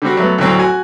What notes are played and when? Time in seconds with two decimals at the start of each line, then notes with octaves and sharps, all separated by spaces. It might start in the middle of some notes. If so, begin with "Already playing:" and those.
0.02 D3 G3 C4 F#4
0.17 F#3 A3 B3
0.38 D2 A2 F#3 C4
0.59 F#4 G#5